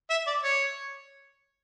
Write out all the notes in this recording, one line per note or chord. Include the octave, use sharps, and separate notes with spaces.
E5
D5
C#5